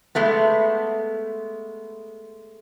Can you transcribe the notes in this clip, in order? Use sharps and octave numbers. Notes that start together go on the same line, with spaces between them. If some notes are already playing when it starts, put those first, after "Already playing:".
G#3 A3 B3